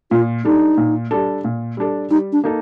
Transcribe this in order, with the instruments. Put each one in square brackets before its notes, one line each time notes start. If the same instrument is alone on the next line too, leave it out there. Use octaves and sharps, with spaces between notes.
[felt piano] A#2 [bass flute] F4
[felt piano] G3 D4 A4 [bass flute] D#4
[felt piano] A#2
G3 D4 A4
A#2
G3 D4 A4
[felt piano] G3 [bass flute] D#4
[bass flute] D4
[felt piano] A#3 D#4 A4